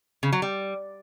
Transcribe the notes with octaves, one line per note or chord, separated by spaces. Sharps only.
C#3
F#3
G3